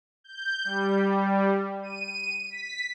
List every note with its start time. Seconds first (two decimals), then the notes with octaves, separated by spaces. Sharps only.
0.24 G6
0.64 G3
1.83 D#7
2.50 B6